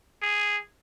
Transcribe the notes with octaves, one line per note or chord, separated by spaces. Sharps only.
G#4